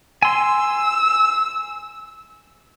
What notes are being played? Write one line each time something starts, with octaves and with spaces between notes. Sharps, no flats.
G#5 C6 E6